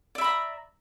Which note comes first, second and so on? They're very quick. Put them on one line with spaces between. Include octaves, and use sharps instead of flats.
D5 E5 B5 A#5